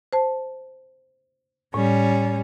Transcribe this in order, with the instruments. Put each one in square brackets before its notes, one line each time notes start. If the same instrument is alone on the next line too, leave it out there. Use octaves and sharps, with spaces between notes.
[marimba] C5 A5
[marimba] A2 [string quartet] G3 C#4